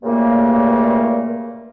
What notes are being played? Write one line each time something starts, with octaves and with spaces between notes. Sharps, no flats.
G2 A#2 C#3 A3 A#3